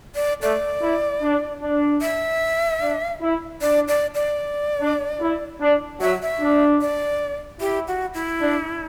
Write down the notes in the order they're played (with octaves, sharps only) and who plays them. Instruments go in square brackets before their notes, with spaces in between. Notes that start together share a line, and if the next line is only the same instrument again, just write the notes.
[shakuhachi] D5
[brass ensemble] A3 [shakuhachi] D5
[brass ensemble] E4
D4
D4
[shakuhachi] E5
[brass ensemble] D4
E4
[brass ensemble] D4 [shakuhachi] D5
[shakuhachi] D5
D5
[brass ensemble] D4
E4
D4
[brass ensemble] F#3 [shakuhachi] E5
[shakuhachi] E5
[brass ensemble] D4
[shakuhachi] D5
[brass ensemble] E4 [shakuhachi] G4
[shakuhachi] F#4
E4
[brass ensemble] D4